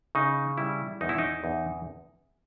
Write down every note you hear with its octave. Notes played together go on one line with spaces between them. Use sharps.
C#3 D#4
G3 E4
E2 D#4
E4
D#4
E2